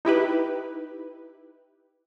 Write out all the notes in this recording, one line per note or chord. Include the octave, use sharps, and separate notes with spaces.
D#4 E4 G4 B4